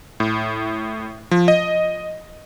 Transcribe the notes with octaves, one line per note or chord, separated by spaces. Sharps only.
A2
F3
D#5